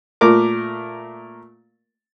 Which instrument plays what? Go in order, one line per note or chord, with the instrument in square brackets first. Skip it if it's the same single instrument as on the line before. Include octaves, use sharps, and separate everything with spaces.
[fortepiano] A#2 A3 A#4 D6